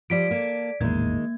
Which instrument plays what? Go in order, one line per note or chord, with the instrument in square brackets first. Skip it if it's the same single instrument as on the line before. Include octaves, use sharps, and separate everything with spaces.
[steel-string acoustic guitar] F3 G3 C5 [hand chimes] D5 B6 D7
[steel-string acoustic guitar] A#3 A4
[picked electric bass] A1 E2 A#2 [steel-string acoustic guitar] D#3 G#3 [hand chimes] A#3 G#6